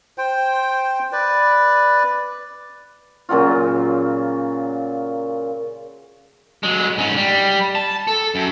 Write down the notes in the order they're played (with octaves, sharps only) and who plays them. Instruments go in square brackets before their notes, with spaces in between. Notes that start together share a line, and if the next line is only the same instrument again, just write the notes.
[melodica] C5 G5
B4 D5
[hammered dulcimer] A#2 C#3 F#3 F4
[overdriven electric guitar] F#3 G#3
G#2 C#4
G3
A5
A4
F#2